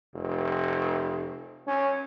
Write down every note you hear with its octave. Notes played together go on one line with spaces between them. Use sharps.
F1
C#4